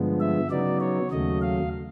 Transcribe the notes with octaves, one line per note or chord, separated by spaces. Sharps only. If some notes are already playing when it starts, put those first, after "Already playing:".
Already playing: G2 D3 F3 G#3 B3
E5
C#3 F#3 B3 D#4 D5
C#5
D#2 C#3 F#3 A3 D#5
F5